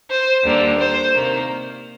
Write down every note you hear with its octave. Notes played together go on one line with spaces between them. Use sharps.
C5
D#2 D3 G3 A#3
C5
C3 D#3 A#3